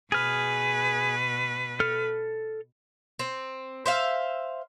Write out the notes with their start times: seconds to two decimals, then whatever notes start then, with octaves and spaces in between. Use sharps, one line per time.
0.12 B2 G#4 B4 F6
1.80 A4 F6
3.19 C4
3.86 C5 E5 F5